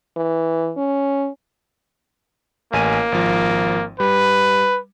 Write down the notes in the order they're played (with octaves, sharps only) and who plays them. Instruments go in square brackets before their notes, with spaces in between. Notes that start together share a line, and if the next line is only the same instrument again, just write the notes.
[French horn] E3
C#4
[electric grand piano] A1 G#5 D#7 [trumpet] A#3
[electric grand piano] G#1 F3
[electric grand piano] G3 [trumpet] B4